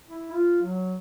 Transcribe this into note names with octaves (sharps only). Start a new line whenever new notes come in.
E4
F4
F#3